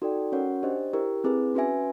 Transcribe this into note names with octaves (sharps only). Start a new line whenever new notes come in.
D#4 F#4 A4 D5 G5
C#4 F#4 A#4 C#5 F#5
D4 G4 C5 D#5
E4 G4 A#4
C4 E4 G#4 B4
C#4 F#4 B4 E5 G#5